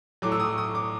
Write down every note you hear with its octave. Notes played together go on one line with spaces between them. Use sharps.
A2 F#3 D6
E6
D#6
D#6
D6